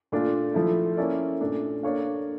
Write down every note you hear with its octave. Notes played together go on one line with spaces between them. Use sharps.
A#2 A3 D4 F4
F3 A3 E4
A#3 C#4 E4 A4 D5
A#2 A3 D4
A#3 D4 A4 C#5 F5